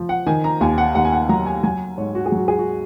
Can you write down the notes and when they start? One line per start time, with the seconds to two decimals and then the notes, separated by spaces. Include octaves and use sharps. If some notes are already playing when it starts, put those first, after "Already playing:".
Already playing: F3
0.09 F#5
0.27 D#3 G#5
0.44 A#5
0.61 D#2 G#5
0.78 F#5
0.95 D#2 F#5
1.05 G#5
1.12 F#5
1.29 F#3 A#5
1.46 G#5
1.63 F#3 G#5
1.98 G#2 C#5
2.15 F#4
2.26 G#4
2.32 F#3
2.37 F#4
2.48 G#4
2.59 F#4